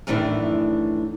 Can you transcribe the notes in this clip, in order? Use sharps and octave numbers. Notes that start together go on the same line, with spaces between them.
F#2 A2 D#3 E3 D4